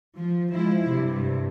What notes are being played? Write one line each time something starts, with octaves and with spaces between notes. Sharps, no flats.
F3
F3 G#3 E4
G2 C3